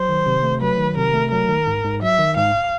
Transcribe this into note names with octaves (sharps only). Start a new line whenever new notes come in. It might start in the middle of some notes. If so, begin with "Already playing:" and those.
Already playing: F#3 C5
D#3
C3
A3
F#3 B4
D#3
C3 A#4
A3
F#3 A#4
D#3
G#2
G#2
F#3 E5
D#3
G#2 F5